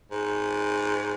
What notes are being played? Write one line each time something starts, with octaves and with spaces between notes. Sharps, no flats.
G#2